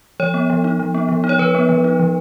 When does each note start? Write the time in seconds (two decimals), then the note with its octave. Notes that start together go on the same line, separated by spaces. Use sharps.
0.20 F3 C#5
0.34 B3
0.50 F3
0.64 D#4
0.79 F3
0.94 B3
1.09 F3
1.24 D#4
1.29 C#5
1.38 F3 B4
1.55 B3
1.69 F3
1.84 D#4
2.00 F3